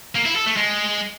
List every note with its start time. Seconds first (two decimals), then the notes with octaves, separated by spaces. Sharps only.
0.15 A#3
0.25 E4
0.36 A4
0.46 A3
0.57 G#3